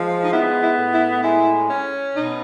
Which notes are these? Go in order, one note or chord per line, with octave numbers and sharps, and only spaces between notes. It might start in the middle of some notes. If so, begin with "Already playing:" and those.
Already playing: F3 G#3
D#4
B3 E4
E4
A2
E4
G#3 E4
C#4
B2 D#4